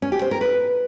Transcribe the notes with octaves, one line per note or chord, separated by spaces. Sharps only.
C#4
G4
C5
A#4
B4